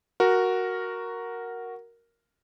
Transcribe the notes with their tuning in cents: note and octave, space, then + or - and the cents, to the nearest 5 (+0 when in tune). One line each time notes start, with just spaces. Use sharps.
F#4 +0 A#4 +0